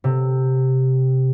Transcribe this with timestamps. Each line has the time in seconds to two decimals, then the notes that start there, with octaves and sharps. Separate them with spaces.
0.04 C3